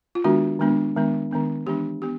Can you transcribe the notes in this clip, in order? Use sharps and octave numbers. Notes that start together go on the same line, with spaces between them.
F4
D#3 G#3 B3 D4 F#4
D#3 G#3 B3 D4
D#3 G#3 B3 D4
D#3 G#3 B3 D4
E3 G#3 B3 D4 G4
B3 D4 G4